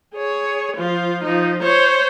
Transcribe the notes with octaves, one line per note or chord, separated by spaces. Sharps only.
G#4 C#5
F3 F4
F3 D#4
C5 C#5